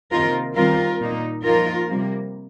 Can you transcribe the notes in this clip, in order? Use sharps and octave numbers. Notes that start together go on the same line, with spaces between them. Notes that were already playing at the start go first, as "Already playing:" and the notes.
C3 D#3 A#3 D#4 F4 A#4
D#3 G3 C4 F4 A#4
A#2 A#3 D#4
F3 A#3 D#4 F4 A#4
C3 G3 A#3